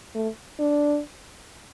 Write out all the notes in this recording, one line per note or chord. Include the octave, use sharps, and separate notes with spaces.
A3
D4